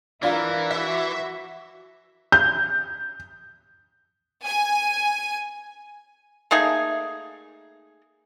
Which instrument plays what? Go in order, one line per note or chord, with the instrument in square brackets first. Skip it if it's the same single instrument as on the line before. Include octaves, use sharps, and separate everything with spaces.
[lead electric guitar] E3 [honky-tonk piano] D4 F4 [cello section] E4 A#4
[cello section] F#4 [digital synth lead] E5 [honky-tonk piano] E6
[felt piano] G6
[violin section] G#5
[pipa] A3 A#3 D#4 G#4